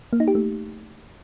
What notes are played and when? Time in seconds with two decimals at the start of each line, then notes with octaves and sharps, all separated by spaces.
0.13 A#3
0.20 D#4
0.28 G4
0.35 A3